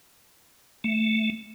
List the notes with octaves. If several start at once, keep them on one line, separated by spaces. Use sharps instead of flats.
A3